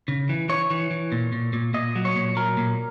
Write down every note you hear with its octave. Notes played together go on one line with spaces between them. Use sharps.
C#3
E3
E3 C#5
E3
E3
A#2
A#2
A#2
A#2 D#5
F#3
C#5
A#2
F#3 A#4
A#2